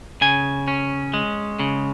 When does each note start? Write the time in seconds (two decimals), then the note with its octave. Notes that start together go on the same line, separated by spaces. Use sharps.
0.21 C#3 G#5
0.68 C#4
1.14 G#3
1.59 C#3